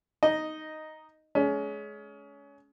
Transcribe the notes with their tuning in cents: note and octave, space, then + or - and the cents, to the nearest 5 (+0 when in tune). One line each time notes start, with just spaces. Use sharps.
D#4 +5 D#5 +0
G#3 +25 C#4 +25